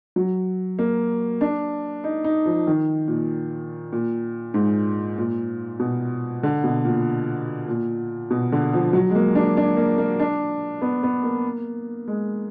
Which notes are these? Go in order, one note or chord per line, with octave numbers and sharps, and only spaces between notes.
F#3
A#3
D4
D#4
D#4
F3
D#3
A#2
A#2
G#2
A#2
B2
D3
B2
A#2
A#2
B2
D3
F3
F#3
G#3
A#3
D4
D4
A#3
A#3
D4
B3
B3
A#3
G#3